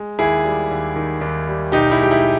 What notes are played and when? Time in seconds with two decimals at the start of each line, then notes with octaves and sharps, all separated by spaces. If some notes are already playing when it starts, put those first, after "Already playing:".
Already playing: G#3
0.19 D#2 E4 G#4
0.45 G3
0.71 D#2
0.96 D#3
1.21 D#2
1.48 G3
1.72 B1 D#4 G4
1.91 E4
1.98 G#3
2.03 G4
2.11 E4